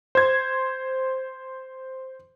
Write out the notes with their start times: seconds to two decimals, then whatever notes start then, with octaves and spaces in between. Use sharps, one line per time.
0.15 C5 G#6